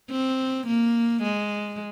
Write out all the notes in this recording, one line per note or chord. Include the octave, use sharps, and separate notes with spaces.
C4
A#3
G#3